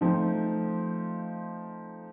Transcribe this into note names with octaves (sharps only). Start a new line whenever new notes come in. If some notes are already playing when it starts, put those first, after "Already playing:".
F3 A3 C4 D#4